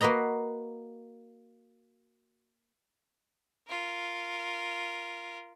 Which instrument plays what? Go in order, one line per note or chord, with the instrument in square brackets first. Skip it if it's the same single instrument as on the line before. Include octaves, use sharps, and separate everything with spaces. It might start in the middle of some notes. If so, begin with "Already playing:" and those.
[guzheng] A#3 F#4 B4 D#5 A#5
[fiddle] F4 A#4